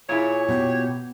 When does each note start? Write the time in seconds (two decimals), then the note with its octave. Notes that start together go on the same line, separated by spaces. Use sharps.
0.09 A#2 E4 G#4 C#5
0.49 B2 G4